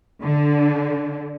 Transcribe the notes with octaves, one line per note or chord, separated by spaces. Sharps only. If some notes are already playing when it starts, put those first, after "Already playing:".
D3